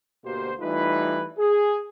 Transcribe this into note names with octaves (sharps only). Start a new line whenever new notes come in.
D2 B2 A#3 F#4 G4 C5
E3 G3 A3 D#4 F4 B4
G#4